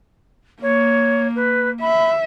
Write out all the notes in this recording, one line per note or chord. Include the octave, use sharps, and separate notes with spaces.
A#3 C#5
B4
E5 B5